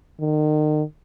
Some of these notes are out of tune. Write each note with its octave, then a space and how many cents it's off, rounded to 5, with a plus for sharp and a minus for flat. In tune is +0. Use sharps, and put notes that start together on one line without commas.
D#3 -35